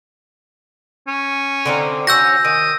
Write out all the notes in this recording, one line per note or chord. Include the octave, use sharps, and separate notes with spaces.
C#4
D3 C4 D#4
C#4 F#4 E6 G6 A#6
D#3 D#6